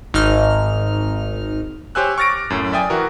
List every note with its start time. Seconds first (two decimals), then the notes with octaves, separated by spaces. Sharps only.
0.14 G#1 D#4 F6
1.95 G4 C5 C#5 G#5 E6 F#6
2.18 C#6 F6 A6 A#6 D7
2.29 D6
2.50 F#2 A2
2.72 D5 E5 G5 G#5 D#6 A6
2.90 E3 F#4 A#4